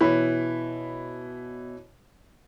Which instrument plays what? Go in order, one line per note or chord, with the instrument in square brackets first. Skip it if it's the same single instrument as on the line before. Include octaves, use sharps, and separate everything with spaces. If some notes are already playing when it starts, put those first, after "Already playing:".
[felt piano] B2 C#5 B5 [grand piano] E3